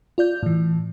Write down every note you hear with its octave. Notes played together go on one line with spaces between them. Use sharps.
F4 D5 G6
A2 E3